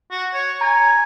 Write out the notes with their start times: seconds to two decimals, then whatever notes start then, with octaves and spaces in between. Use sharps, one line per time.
0.11 F#4
0.34 C#5
0.61 G#5 A#5